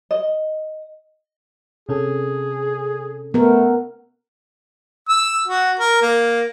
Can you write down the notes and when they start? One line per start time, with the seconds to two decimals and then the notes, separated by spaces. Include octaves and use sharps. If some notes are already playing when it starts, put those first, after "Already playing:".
0.11 D#5
1.89 C3 C#4 G#4 A4
3.34 A3 B3 A#4
5.09 E6
5.48 F#4
5.79 A#4
6.02 A#3